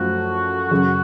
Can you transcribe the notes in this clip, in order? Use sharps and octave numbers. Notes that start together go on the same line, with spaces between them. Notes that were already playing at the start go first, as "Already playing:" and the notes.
Already playing: F#2 F3 A3 F4 F#4
F#2 C#3 F#3